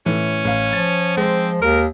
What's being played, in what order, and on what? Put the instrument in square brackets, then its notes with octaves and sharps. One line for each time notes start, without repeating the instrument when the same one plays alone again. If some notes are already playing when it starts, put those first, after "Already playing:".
[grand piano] A2 E3 [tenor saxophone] C#4
[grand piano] A1 F5
[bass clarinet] F3 [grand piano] A6
[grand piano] G#3 C5 [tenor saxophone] C4
[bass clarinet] D#2 [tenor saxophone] A#4